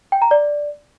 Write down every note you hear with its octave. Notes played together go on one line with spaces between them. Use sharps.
G5
A#5
D5